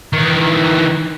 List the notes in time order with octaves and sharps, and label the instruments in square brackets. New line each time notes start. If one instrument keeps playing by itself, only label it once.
[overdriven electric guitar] D#3 E3